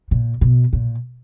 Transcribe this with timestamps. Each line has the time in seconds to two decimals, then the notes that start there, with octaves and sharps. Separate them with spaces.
0.11 A#2
0.41 B2
0.73 A#2